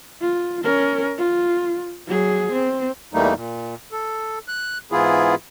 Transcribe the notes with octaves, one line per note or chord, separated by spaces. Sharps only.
F4
C#4 A#4
F4
F#3 G#4
C4
E2 E3 G3 A3 A#3 D#4
A#2
A4
F#6
G#2 E3 B3 E4 F4 G#4